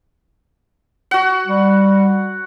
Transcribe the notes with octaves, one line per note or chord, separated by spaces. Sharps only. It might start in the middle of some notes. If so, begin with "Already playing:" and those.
F#4 F#5
G3